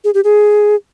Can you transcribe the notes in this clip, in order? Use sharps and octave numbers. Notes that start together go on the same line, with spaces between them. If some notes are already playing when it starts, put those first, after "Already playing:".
G#4
G4
G#4